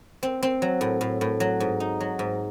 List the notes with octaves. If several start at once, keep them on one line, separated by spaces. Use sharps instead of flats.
C4
C4
F#3
A2
A2
A2
F#3
G#2
D#4
F#3
G#2